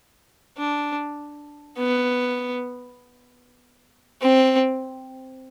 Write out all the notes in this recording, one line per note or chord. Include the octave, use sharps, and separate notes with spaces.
D4
B3
C4